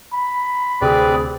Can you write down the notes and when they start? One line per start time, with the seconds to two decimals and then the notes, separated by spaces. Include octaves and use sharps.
0.13 B5
0.81 D2 C3 C4 G#4 B4 D5